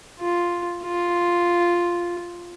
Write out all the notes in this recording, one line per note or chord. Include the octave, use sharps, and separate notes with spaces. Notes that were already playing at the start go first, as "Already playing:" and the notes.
F4
F4